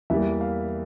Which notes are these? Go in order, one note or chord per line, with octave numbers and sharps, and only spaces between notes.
E2 E3 G3 A#3 E5
F5